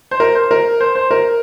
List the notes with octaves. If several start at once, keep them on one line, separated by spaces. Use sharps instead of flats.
C5
A#4
C5
A#4
C5
C5
A#4